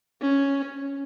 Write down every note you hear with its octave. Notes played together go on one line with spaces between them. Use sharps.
C#4